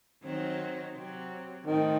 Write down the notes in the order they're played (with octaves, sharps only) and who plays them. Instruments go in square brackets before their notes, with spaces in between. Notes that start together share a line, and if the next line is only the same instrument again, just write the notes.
[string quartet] D#3 F#3 C4 D#4
C3 F#3 C4
[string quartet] A2 F3 A3 C4 [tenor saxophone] D#3